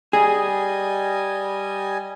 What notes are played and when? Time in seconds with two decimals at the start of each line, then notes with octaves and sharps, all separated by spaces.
0.13 G3 G#4 D#5 G#5